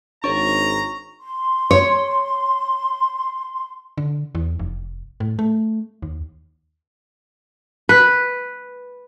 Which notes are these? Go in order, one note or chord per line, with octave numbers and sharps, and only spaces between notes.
G#1 D4 C#5 A#5 C#6
C6
C#5
D3
E2
F1
A2
A3
D#2
B4